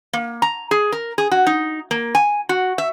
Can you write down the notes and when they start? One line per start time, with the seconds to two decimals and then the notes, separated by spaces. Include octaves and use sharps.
0.13 A#3
0.42 A#5
0.71 G#4
0.92 A#4
1.18 G#4
1.31 F#4
1.47 D#4
1.91 A#3
2.15 G#5
2.49 F#4
2.78 E5